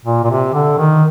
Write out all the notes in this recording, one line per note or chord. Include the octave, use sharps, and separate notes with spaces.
A#2
A#2
C3
D3
D#3